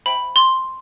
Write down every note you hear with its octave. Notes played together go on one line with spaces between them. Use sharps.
C5 E5 G5 B5
C6